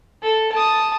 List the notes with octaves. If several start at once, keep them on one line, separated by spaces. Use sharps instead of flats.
A4
A5 D#6